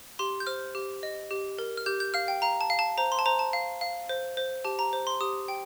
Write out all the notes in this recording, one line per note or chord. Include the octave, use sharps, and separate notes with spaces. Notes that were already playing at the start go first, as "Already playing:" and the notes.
G4 C6
G6
C5 F6
G4
D#5
G4
A#4
F6
G4 G6
G6
F5 F6
G5
F5 A#5
A5
F5
A5
C5 A#5
C6
A5
C5 A#5
A5
F5
F5
C5
C5
G4 A5
A#5
C5
C6
G4 D#6
G5